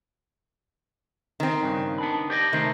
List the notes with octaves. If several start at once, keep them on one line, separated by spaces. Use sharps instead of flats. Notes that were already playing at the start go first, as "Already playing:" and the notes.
D#3 C4
G2 C#3
B3 D4 B5
G4 D5 D#5
C3 D#3 A3 C5